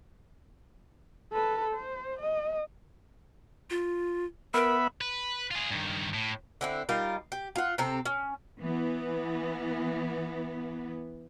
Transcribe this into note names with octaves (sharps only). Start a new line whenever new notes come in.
A4 B4
C5
D#5
F4
B3 A#4 E5 B5
B4
F4 G#4
G2 D#3
A2
D3 C4 E4
G3 D#4 F4 A#4
G4
F4 F#5
C3 C4 A4 A#5
C#4
E3 B3